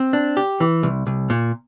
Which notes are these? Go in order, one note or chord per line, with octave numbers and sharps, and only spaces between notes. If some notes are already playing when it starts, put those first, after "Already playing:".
Already playing: C4
D4
G4
E3
C2
C2
A#2